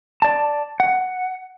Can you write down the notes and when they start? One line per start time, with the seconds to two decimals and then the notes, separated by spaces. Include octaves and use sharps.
0.22 D5 A5
0.80 F#5